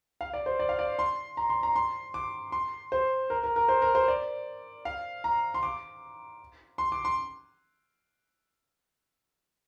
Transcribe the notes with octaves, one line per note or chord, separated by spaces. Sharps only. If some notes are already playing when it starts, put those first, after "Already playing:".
F5
D5
C5
D5
F5
D5
C6
A#5
C6
A#5
C6
D6
C6
C5
A#4
A#4
A#4
C5
A#4
C5
D5
F5
A#5
C6
D6
C6
D6
C6